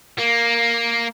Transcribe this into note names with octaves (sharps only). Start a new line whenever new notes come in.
A#3